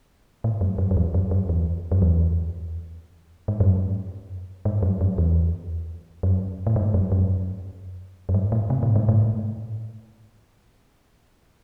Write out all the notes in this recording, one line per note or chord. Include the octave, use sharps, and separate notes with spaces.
A2
F#2
F#2
F#2
E2
F#2
F#2
E2
F#2
E2
G#2
F#2
G#2
F#2
F#2
E2
F#2
A2
G#2
F#2
F#2
F#2
G#2
A2
C3
A2
G#2
A2